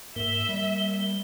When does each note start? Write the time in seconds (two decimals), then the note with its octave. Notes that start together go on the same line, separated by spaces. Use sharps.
0.16 G#2 A#3 E5 G7
0.49 G3